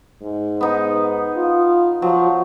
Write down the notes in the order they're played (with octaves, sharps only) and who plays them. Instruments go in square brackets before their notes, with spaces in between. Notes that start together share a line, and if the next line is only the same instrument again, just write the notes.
[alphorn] G#2
[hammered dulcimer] B3 D#4
[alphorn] F4
[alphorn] F3 [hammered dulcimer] F#3